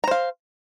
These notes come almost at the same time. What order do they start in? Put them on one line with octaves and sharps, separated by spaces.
A#5 C5 F5